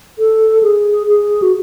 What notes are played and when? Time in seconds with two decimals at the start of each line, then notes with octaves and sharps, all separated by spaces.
0.19 A4
0.63 G#4
1.07 G#4
1.42 F#4